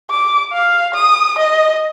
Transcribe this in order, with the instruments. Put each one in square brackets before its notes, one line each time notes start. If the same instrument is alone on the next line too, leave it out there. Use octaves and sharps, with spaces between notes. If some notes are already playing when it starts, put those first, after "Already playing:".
[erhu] D6
F5
D#6
D#5